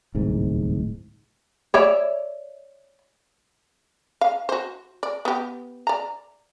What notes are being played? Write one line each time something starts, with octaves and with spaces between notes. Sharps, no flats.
D1 C2 G#2
C#5 D5 E5
F5
F#4 C5
D5
B3 G4
D5 A#5